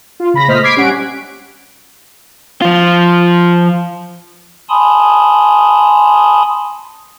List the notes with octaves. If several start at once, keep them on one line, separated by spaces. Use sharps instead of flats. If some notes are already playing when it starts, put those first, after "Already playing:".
F4
C#3 B5 A#6
A#2 A3 C5 D#5 F6 B6
D6 G#6 B6 C7 D7
G3 C#4 F#5 D7
F3 F4
G#5 A5 B5 C6 D#6